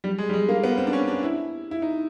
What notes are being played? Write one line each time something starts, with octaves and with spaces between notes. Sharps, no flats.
G3
G#3
G3
G#3
A#3
B3
C4
D4
C#4
D4
E4
E4
D#4